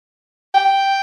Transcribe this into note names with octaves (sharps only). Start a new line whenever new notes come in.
G5